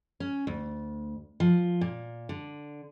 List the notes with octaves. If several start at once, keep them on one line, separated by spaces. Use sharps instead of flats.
C#4
D2
F3
A#2
D3